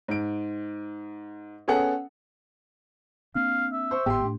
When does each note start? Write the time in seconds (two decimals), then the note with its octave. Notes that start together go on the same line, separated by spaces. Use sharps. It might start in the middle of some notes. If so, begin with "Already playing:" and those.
0.08 G#2 D7
1.68 B3 C#4 G#4 A4 F#5
3.35 A#3 C4 D4 F5
3.72 E5
3.91 C5 C#6
4.06 G#1 A2 B3 G4 C6
4.21 A2 D4